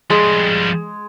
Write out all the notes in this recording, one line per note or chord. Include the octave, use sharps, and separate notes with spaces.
F2 G3 G#3